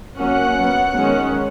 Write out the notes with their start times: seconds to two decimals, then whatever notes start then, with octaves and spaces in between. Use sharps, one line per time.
0.17 F#3 A#3 C#4 F#5
0.56 F#3 B3
0.95 D#3 G#3 C#4